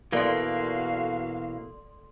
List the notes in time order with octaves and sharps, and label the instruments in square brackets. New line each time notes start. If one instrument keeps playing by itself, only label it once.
[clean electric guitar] B2 E3 A#3 [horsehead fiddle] F#4 F5 [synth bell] A4 D5 C6